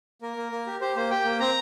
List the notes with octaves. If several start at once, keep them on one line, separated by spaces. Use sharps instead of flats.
A#3 A#4
A#3
A#3
G4
G4 C5
A#3 C5
G4 G5
A#3
C4 A#5